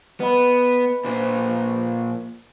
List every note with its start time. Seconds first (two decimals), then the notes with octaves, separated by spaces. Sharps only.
0.20 B3 B4 D#5 B5
1.05 A#2 C5